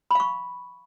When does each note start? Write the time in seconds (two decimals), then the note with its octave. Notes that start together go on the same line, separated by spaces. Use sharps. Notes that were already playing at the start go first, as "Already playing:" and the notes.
0.11 B5
0.15 F5
0.20 C#6